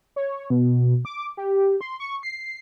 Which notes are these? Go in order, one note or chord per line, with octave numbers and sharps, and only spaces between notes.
C#5
B2
D6
G4
C6
C#6
C7